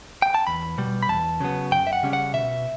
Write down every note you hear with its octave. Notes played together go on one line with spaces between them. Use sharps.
G5
A5
E2 B5
B2 G3
B5
E2 A5
C#3 F#3 B3
F#2 G5
E5
F#5
C#3 G3 C#4
F#5
B2 E5